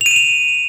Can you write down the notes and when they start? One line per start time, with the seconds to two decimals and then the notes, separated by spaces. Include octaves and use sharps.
0.01 F7
0.06 D#7
0.11 E7
0.16 F7